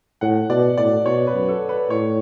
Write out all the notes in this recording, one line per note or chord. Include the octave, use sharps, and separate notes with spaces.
A2 F#5
B2 D5
A2 D5
B2 C#5
B4
F#2
A4
B4
A2 C#5